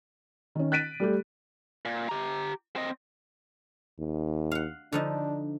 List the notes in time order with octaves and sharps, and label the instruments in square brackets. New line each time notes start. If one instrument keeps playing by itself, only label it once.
[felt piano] D#3 C#4
F#6 A6 B6 D7 D#7
G3 A3 G4
[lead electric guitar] A#2
G4 A#5
C4 D#5
[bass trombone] D#2
[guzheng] F5 F#5
[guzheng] D3 F3 D#4 [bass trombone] D4